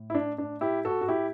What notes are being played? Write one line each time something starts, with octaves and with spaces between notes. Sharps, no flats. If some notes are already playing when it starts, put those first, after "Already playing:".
Already playing: A2
E4
D4
D4
E4 G4
F#4 A4
F#4
E4 G4